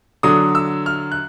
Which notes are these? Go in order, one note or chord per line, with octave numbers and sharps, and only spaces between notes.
D3 F#3 D#6
E6
F6
F#6